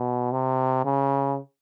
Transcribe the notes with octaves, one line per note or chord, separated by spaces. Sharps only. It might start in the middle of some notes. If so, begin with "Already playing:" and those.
Already playing: B2
C3
C#3